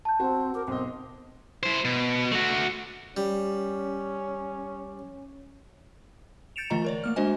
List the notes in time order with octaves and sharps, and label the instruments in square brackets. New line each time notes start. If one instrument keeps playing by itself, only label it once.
[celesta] A5 G6
[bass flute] C4 [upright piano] F#4 C5
[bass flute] A#4 [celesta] D6
[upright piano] B1 D#5 [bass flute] C4
[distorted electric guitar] E4 C5
B2
A3 F#4
[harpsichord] G3 [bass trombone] C#4
[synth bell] G6 A6 C#7 D7 E7 F7
D3 E3 A3 F4 D#5 A#5
A#4 C#5 D5
A3 A#3 F6
G#3 D4 F#4 C5 D#5 G#5